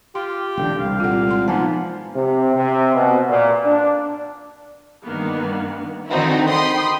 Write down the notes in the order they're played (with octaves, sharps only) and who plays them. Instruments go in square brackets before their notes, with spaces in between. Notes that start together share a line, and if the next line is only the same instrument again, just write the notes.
[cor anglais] F4 [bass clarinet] G4 [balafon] C6
[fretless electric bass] E1 D3 [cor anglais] G5
[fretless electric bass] C2 [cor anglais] F5
[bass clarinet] A#2 [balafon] F4 A4 F#5
[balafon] G#3 F#5 C6
[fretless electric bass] F3 [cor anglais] A#3 [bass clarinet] B3 [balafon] D#4 G#5 A5
[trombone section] C3
C3
B2
A#2
D4
[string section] G2 D#3 A#3 B3
D3 D#3 C4 D#4 E4 F#4
G5 B5 C6 D#6